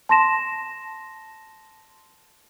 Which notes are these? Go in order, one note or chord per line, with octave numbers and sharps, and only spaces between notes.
A5 C6 A#6 E7